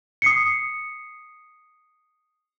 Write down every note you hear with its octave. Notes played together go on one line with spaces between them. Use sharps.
D#6 C7 C#7